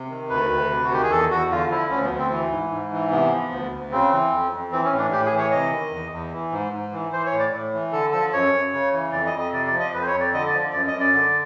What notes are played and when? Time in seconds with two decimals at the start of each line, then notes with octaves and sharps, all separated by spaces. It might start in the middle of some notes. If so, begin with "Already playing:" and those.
Already playing: C3
0.10 D#3
0.30 D2 B4
0.51 D2
0.70 C3
0.84 F#4
0.91 D#3 G4
1.02 G#4
1.10 E2 A4
1.31 E2 F#4
1.51 D3 F4
1.70 F3 E4
1.90 D2 C#4
2.04 B3
2.11 D2
2.18 C4
2.30 E3
2.51 G#2
2.71 G#2
2.92 E3
3.11 C3 B3
3.32 F3
3.52 D2
3.71 D2
3.91 C#3 C4
4.12 E3
4.32 F2
4.52 F2
4.72 E3 C4
4.85 C#4
4.92 A2
4.98 D4
5.11 A2 G4
5.25 G#4
5.32 E3
5.38 C#5
5.51 C3 D#5
5.72 D#3
5.91 E2
6.12 E2
6.33 E3
6.52 G#2
6.73 G#2
6.92 E3
7.12 E3 C5
7.26 C#5
7.32 A2
7.39 D5
7.52 A2
7.73 E3
7.92 D3 A4
8.12 F3 A4
8.33 F#2 C#5
8.53 F#2
8.73 C#3
8.93 E3
9.12 F2 D5
9.27 D#5
9.33 F2
9.39 D#5
9.52 C3 D5
9.66 D5
9.73 F3
9.80 D#5
9.93 F2 B4
10.02 C5
10.07 C#5
10.14 F2
10.20 D5
10.33 D3 D#5
10.47 D5
10.53 F3
10.73 F#2 D5
10.87 D#5
10.93 F#2
11.00 D5
11.13 D3